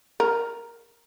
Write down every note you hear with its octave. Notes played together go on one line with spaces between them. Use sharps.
A#4